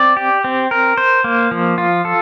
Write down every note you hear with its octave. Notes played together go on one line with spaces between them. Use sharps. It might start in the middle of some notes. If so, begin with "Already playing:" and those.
Already playing: C4 D5
G4
C4
A#4
C5
A#3
F3
F4
A4